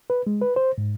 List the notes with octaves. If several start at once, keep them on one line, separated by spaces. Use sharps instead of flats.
B4
G#3
B4
C5
G#2